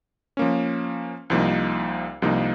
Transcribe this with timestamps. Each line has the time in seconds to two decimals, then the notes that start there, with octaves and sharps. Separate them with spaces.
0.37 F3 A#3 C#4
1.30 C2 C3 F3 A#3 D#4
2.22 C2 C3 F3 A#3 D#4